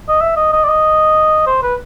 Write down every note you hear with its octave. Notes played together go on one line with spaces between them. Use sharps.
D#5
E5
D#5
D#5
D5
D#5
C5
B4